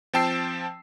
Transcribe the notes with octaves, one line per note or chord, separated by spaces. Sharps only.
F3 C4 G5 A5 E6 C7